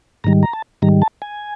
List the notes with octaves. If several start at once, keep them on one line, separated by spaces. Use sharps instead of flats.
G#2 D#3 G3 A#5
A#5
A5
G#2 D#3 G3 A#5
A5
G#5